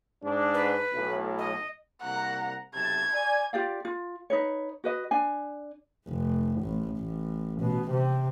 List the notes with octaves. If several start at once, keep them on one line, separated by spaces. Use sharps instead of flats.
G#2 D4
B4
B1 A2
D#5
C2 A#3 F#5 A#5
B1 C3 A5 G#6
D5 G#5
F4 G4 D5 F5
F4
D#4 B4 C#5
F#4 B4 D#5
D4 G#5
F1
A1
A1
B2
C3